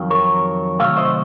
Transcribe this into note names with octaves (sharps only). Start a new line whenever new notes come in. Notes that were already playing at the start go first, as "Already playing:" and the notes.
Already playing: F2 D#3 F#3
A#4 C#5
C3 D#3 F#3 A3 C#5 F5
C5 D#5